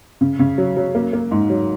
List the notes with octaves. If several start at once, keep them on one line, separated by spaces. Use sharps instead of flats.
C#3
C#3
F#3
F#3
A#3
A#3
G#2
F#3